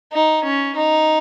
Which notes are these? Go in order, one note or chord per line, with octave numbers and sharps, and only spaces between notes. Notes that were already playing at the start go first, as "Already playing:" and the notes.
D#4
C#4
D#4